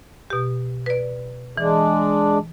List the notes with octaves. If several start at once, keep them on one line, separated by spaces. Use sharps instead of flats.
B2 G4
B4 D5
E3 G#3 D4